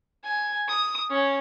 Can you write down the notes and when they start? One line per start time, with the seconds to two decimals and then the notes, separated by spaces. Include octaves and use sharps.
0.24 G#5
0.68 D#6
1.10 C#4